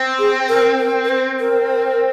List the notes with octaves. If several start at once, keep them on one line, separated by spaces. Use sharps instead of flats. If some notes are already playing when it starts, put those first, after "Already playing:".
Already playing: C4
G#4
A#4
A#4
A#4
C5
A#4